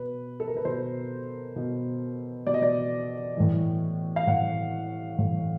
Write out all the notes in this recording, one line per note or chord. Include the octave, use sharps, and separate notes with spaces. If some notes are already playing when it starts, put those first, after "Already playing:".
Already playing: B2 B4
A4
A#4
B4
B2 C5
B2
B2 D5
D#5
D5
A2 E3
F5
A2 E3 F#5
A2 E3